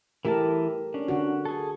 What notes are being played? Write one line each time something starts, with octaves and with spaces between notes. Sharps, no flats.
E3 A3 E4 G4 A#4 A5
C#4 D4
D3 F#4
G#4 A4